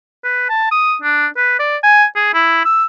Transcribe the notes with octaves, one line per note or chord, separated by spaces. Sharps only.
B4
A5
D#6
D4
B4
D5
G#5
G#4
E4
E6